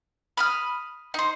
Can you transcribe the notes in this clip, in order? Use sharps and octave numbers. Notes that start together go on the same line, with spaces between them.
B5 D#6 F6
D#4 C5